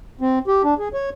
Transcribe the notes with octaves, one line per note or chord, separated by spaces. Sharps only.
C4
G4
D4
G#4
C#5